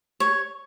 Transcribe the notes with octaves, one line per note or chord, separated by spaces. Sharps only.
C#5